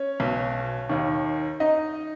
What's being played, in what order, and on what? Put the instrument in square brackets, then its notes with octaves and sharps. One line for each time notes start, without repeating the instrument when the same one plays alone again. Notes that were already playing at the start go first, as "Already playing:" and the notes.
Already playing: [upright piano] C#4 C#5
B1 B2
D#2 D#3
D#4 D#5